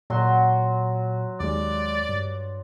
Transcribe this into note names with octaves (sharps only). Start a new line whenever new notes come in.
A#2 F#3 F#4 C6
D#2 G#3 D5
G2